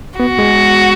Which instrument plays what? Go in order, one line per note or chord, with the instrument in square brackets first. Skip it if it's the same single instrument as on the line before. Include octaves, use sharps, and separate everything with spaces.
[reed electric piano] B3 [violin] F#4
[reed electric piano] G#3